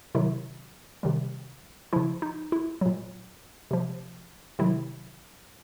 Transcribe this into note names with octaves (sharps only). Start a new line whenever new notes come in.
C3 D#3 F#3 E4
C3 D#3 G3
C#3 F3 E4
D#4
E4
A#2 F#3
C3 F3
C3 D#3 F#3 E4